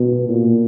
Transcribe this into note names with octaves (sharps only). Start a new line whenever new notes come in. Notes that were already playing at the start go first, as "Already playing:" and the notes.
Already playing: B2
A#2